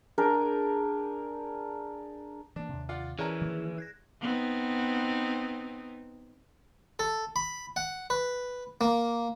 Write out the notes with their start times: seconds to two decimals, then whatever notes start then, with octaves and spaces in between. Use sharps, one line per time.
0.18 D4 G#4 A#4 G5
2.56 E3 A#3 D4
2.69 D#2 C3
2.89 F4 D5 F#5
3.19 E3 C#4 G#4 A#4
3.41 D#3 F3 A#3
3.78 F#6 G#6 A#6
4.21 B3 C4 D#4
6.99 A4
7.36 B5
7.76 F#5
8.10 B4
8.81 A#3